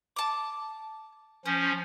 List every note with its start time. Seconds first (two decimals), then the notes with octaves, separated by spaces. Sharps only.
0.16 A5 D6
1.46 F3 C#4 C5